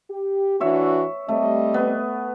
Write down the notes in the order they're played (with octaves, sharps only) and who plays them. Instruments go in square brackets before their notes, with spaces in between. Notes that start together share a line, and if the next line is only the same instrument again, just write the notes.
[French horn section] G4
[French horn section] E3 D4 F#4 [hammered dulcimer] C#5 E5 C#6
[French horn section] G3 C4 D#5 [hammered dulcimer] A3
[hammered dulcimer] B3